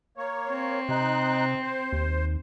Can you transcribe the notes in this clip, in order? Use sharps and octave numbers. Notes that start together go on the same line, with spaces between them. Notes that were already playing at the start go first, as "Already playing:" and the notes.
A#3 C#5
C4
C3 D#4 F#6
C5
D#2